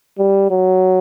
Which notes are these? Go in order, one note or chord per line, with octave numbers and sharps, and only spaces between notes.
G3
F#3